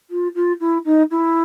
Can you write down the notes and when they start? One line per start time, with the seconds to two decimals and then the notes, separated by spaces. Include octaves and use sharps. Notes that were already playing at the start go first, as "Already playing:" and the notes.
0.10 F4
0.35 F4
0.60 E4
0.85 D#4
1.11 E4